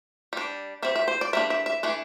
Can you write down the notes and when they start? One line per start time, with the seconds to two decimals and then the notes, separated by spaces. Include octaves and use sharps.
0.33 G3 D4
0.82 G3 C4 E5
0.96 E5
1.08 C5
1.21 D5
1.33 G3 A#3 D4 E5
1.50 E5
1.66 E5
1.83 E3 A3 D4